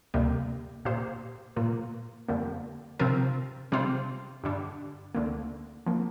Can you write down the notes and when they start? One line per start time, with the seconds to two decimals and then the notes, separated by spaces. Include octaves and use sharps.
0.14 D2 C3 G3 A#3 G4
0.85 A#2 A#3 G4 C5
1.56 A#2 A#3 F4
2.28 F2 D3 G3 A#3
2.99 C3 F3 C4 F4 A#4
3.72 C3 G3 C4 F4 C5
4.44 G2 D3 G3
5.15 D2 D3 A#3
5.86 F3 A#3